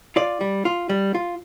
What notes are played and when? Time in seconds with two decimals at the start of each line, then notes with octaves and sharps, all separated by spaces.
0.16 F4 D5
0.41 G3
0.65 F4
0.89 G3
1.14 F4